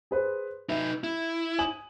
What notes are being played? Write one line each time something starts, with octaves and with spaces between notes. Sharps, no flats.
G#4 B4 C5
D#4 B4 E5
E4
G#5 D#6 F#7